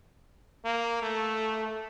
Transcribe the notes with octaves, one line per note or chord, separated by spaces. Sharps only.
A#3
A3